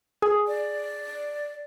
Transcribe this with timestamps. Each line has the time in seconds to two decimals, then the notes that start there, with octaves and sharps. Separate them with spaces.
0.22 G#4
0.47 D5